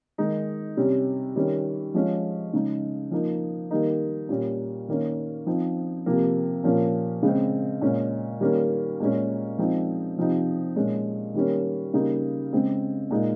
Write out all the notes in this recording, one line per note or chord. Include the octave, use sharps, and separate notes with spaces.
D#3 G#3 D#4
C3 G3 C#4
D#3 G3 C#4
F3 G#3 C#4
C#3 G#3 D#4
F3 A#3 D#4
D#3 G3 A#3 D#4
A#2 G3 C#4
D#3 A#3 C#4
F3 C4 D#4
C3 F3 A#3
A#2 F3 A#3 C#4
C#3 G#3 C4
A#2 G#3 C#4
D#3 G3 A#3 C#4
A#2 G#3 C#4
F3 G#3 C4 D#4
C3 F3 C4 D#4
A#2 G#3 C#4
D#3 G3 A#3 C#4
C#3 G3 A#3 D#4
C#3 G#3 C4
A#2 G#3 D#4